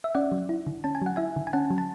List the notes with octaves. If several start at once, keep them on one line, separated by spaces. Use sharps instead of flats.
E5
C#4 D5 F#5
F#3
E4
D3
C#4 A5
G#5
F#3 F#5
E4 E5 G#5
D3
G#5
C#4 F#5 A5
F#3
A5